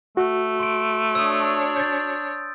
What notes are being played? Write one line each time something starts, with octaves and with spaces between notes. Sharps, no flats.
A3 F#4
C6 D7
D4 C#5 D#6 E6
G6 A6